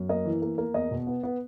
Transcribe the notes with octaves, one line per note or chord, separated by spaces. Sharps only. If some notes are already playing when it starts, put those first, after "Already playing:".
Already playing: F#2
A#3 D#5
E3
A#3
A#3
E2 D#5
B2
B3
B3